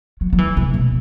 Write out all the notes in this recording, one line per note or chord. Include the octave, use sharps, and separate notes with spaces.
F#3
F#3
E3
C3
B2